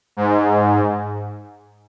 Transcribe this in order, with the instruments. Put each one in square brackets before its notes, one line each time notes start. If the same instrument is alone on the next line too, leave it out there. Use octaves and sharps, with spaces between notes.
[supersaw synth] G#2